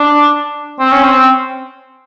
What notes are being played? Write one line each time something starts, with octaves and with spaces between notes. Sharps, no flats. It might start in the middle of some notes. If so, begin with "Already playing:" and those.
Already playing: D4
C4
C#4
C4